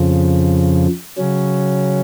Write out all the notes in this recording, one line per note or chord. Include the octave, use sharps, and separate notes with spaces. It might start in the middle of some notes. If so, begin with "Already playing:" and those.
Already playing: F2 C#3 F3
C#3 F#3 C#4